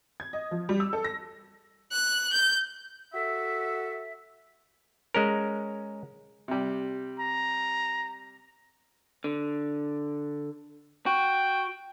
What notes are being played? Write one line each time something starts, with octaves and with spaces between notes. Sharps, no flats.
G#6
D#5
F3
G3
E6
A4
A#6
F#6
G6
F#4 A4 E5
G#3 C#4 A#4
C3 G3
A#5
D3
F#4 G5